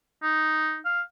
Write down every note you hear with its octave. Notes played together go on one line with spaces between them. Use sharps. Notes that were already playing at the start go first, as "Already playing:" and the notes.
D#4
F5